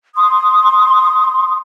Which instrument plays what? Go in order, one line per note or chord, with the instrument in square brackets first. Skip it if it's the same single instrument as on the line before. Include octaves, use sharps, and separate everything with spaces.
[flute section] C6 D#6